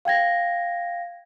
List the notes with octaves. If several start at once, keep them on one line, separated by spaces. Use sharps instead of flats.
F5 G5 G#6 A#6